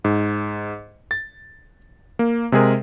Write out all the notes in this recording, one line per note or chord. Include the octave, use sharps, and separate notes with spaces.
G#2
A6
A#3
C3 G#3 G#4 A#4